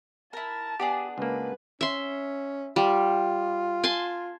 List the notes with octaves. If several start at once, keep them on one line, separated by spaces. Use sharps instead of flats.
E4 A#4 A5
B3 D4 G4 G#4
C#2 A#3 B4
C#4 E5 C6
G3 F4
G#5 A5 C6